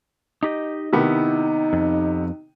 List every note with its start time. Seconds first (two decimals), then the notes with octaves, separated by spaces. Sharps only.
0.43 D#4 G4 D#5
0.93 C3 D#3 B3 D#4 E4
1.73 F2